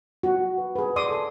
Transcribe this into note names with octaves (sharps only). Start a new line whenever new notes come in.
F#4
B4
G#4 B4
D5 C6 D6 D#6
A4 C6